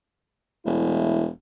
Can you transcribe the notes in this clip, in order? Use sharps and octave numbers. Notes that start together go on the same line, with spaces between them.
E1 E3 A3 E4